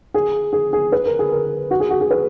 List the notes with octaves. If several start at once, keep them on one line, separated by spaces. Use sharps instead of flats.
G#4
G#4
G#4
B4
A#4
G#4
A#4
F#4
G#4
F#4
G#4
B4